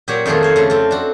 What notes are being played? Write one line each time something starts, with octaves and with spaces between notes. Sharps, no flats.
A#2 F#3 G4 C#5 F#5
F2 D#3 A3 A#3 F4 G#4
C5 C#5
C#3 A3 D4 F4
A3 C4
D4 F#4